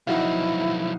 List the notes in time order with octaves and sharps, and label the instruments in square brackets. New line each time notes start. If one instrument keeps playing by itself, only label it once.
[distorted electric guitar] B1 F2 [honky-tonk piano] D#4 F#4 F5 [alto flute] E4